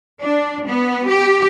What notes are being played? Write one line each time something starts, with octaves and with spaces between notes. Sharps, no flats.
D4
B3
G4